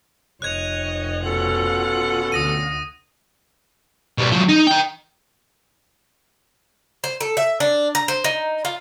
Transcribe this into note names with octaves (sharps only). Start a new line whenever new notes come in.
F1 C#5 D#5 F#6 G#6 F7
B2 C#4 F4 A4 F#5
D2 D#6 A#6 D#7
B2 G3
F3 F#3
D#4
D#5 G5
C5
A4
E5
D4
A#5
C5
D#4
F4